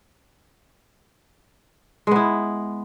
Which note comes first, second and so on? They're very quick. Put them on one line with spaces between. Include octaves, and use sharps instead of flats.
G#3 B3 E4